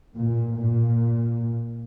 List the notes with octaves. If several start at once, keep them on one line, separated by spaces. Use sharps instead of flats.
A#2
A#2